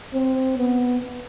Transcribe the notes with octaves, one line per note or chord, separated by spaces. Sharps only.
C4
B3